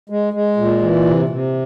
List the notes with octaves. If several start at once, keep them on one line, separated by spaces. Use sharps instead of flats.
G#3
G#3
A#2
E3
C3
C3